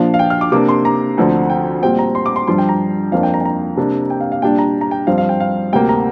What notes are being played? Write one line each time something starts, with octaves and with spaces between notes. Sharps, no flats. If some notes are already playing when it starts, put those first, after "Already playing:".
Already playing: A#2 F3 D4 F5
F5
G5
F6
D6
C3 A#3 D4 D6
C6
A#5
D2 D3 F3 C4
G5
A#2 G3 C4 G5
A#5
C6
D6
C6
G2 F3 D4 C6
G5
A#5
F2 F3 A#3 D4 F5
G5
A#5
G5
A#5
C3 A#3 D4
G5
F5
F5
A#2 G3 D4 G5
A#5
A#5
G5
G2 F3 C4 F5
F5
G5
F5
D2 C3 A#3 G5
A#5